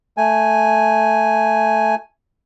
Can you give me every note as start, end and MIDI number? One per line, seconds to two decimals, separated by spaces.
0.17 1.95 57
0.17 1.95 80